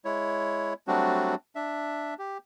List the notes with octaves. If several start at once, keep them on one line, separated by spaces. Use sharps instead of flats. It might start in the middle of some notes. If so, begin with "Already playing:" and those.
G#3 E4 C#5
F#3 G3 A3 C4 D4 F#4
D4 E5
G4